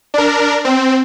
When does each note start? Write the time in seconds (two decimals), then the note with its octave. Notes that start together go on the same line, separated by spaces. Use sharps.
0.14 D4 A#4
0.65 C4